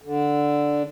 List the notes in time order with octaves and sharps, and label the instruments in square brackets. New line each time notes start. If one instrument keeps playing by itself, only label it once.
[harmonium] D3